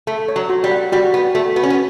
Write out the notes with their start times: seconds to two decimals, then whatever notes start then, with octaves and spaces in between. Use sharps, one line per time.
0.07 A3 A4
0.28 C#5
0.36 F#3
0.50 F#4
0.64 G3
0.71 F#5
0.92 G3 F#4
1.14 B3 F#4
1.35 A3 F#4
1.56 B3 F#4
1.63 C#4
1.70 B3